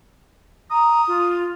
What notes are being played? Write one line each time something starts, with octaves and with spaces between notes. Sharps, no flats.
A#5 D#6
F4